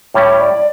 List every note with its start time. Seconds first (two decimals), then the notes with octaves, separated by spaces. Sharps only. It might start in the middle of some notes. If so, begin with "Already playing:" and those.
0.14 A2 G3 C#4 E4 C#5
0.40 D5